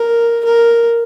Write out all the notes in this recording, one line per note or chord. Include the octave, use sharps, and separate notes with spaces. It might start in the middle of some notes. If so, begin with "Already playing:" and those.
Already playing: A#4
A#4